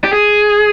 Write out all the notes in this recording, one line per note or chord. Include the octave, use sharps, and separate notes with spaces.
G4
G#4